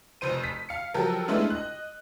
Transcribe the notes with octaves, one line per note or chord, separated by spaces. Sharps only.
F1 F2 C5 D#7
B6
F5 C#7
F3 F#3 G4 A4 A#4
G#3 A3 B3 D4 E4 F4
D#5 F#6